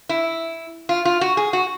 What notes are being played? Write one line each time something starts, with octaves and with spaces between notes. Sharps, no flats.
E4
F4
F4
F#4
G#4
F#4